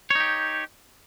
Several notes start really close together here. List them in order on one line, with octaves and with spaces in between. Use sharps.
C#5 D#4 G4